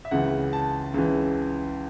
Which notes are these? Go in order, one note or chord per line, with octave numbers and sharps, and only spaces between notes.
E5
C#2 C#3 E3 F#5
A5
C#2 C#3 E3